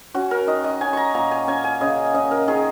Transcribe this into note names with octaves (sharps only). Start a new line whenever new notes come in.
C#4 F#4
A#4
D#3 D#5
D#5
C#4 G#5
A#5 C#6
A#2 A#5
G#5
C#4 G#5
G#5
C#3 D#5
C#4 D#5
A#4
D#3 G#4